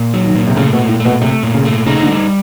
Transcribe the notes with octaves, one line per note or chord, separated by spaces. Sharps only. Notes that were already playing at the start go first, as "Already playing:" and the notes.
Already playing: A#2
F#3
D#3
A#2
C3
C#3 A3
B2
A#2
A2
A3
B2
C3 A3
A#2
C#3
A3
C#3 D#4
D3
G3